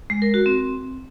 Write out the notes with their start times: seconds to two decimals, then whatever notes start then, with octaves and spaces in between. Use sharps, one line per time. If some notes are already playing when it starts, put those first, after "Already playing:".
0.10 G#3
0.22 A#4
0.34 F#4
0.46 C4